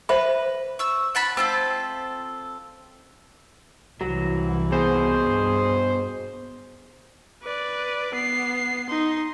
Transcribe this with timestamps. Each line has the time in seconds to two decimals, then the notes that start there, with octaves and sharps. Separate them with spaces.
0.09 B4 C5 E5 B5
0.79 C#6 E6
1.15 F#5 A5 B5
1.37 C4 F4 A4 E6
4.01 C2 E3 F#3
4.72 B2 G#4 C5
5.20 G2
7.43 B4 D5
8.14 B3 C7
8.90 D#4 C6